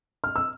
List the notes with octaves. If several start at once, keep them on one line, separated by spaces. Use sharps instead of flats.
F6
E6